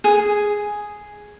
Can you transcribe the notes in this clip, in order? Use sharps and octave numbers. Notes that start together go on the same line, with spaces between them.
G#4